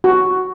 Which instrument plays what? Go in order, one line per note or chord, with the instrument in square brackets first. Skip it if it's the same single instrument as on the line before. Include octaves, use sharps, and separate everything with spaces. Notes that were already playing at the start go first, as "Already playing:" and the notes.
[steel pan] F#4